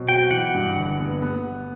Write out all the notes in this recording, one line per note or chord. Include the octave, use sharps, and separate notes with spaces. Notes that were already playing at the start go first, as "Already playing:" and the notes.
Already playing: B2 F#3 C4
F#4 G5
E3 F#5
G2
G1
B3
B3